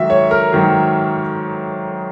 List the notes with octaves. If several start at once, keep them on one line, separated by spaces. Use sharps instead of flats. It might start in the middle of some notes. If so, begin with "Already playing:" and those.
Already playing: G#2 D#3 F#3 E5
C#5
A#4
G#2 D#3 F#3